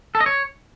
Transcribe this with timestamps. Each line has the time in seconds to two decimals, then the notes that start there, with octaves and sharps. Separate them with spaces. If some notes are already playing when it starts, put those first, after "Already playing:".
0.15 A4
0.20 D#5
0.26 C#5